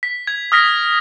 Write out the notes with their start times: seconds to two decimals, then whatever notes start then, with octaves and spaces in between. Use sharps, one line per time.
0.03 B6
0.27 G#6
0.52 D#6 F6 A#6 B6